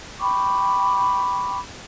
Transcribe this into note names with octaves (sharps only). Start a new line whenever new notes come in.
G5 B5 C#6 D6